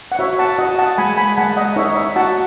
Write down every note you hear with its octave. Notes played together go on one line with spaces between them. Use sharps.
F#5
F#4 C#5 E5
F#5 A5
F#4 D#5 F#5
F#5 A5
G#3 G#5 B5
G#5 B5
G#3 F#5 A5
D#5 F#5
D#4 C#5 E5
C#5 E5
F#4 F#5 A5